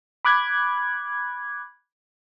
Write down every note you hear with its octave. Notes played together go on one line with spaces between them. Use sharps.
B5 D6 F#6 G#6